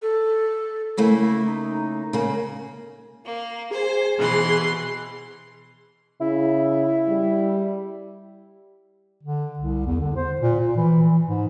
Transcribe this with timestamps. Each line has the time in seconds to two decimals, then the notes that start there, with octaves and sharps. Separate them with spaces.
0.02 A4
0.97 C#3 A3 A#3 E4
1.45 D#4
2.13 C#3 A#3
3.24 A#3
3.71 G#4 C5
4.17 B2 E3 C6
6.21 C#3 E4
7.08 G3
9.23 D3
9.59 C2
9.87 E2
10.00 D3
10.16 C5
10.41 A#2
10.60 A#2
10.77 E3
11.03 E3
11.26 G#2